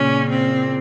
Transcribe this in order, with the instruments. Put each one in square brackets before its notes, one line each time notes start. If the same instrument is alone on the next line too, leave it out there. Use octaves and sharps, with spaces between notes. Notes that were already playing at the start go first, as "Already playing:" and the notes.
Already playing: [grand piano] A#2 C#3 [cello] C#4
[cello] C4